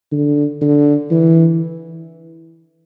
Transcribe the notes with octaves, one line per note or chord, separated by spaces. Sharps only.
D3
D3
E3